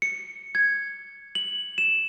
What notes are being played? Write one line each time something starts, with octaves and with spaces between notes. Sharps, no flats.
C#7
G#6
F#7
E7